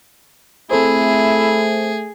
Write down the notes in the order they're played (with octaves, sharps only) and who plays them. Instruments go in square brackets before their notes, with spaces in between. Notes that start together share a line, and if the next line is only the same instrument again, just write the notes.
[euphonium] A3 [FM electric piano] C4 A4 C5 [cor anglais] E4 [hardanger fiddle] G#4